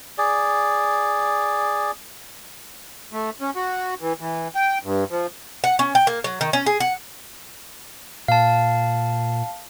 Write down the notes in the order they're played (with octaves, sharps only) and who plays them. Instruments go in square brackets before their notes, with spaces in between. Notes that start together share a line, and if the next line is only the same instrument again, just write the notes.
[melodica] G#4 D5
[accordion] A3
C#4
F#4
E3
E3
G5
G2
F3
[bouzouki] F#5
C#4
G5
A#3
F#3
D#3
C#4
G#4
F#5
[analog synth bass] A#2 [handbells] F5 A5